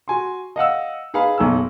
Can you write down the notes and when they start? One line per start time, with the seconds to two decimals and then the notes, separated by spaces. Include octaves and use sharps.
0.08 F#4 G#5 C6
0.56 D#5 F5 F#5 E6
1.14 D#4 G#4 B4 F5 B5
1.38 F#1 B1 D#4 G#5 E6